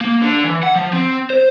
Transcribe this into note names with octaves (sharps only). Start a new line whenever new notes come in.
A#3
D3
E3
F#5
F3
C4
C5